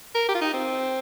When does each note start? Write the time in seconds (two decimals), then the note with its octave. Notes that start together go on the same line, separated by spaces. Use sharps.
0.15 A#4
0.28 G4
0.35 F4
0.41 D#4
0.54 C4